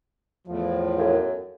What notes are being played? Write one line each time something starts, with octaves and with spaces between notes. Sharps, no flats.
E2 A2 F3
F#2 A4 A#4 F5